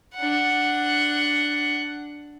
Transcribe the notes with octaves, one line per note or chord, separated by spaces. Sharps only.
D4 F#5